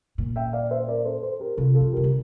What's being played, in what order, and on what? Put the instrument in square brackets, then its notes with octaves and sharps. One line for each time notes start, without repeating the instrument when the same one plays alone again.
[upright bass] A#2
[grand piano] E5 G5
D5 F5
C5 E5
A#4 D5
A4 C5
A4 C5
G4 A#4
[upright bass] C3 [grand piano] F4 A4
[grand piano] F4 A4
[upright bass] F3
[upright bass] C3 [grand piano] G4 A#4
[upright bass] D3